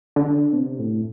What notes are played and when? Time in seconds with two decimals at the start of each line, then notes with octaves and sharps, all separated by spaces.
0.16 D3
0.53 B2
0.58 C3
0.79 A2